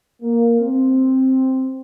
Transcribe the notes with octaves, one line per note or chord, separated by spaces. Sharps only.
A#3
C4